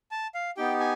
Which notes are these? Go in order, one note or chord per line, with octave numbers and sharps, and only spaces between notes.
A5
F5
B3 D#4 G4 G5
G#5